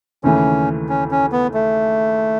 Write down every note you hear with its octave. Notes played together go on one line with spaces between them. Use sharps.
D#2 C#3 E3 A3 C#4
C#4
C#4
B3
A3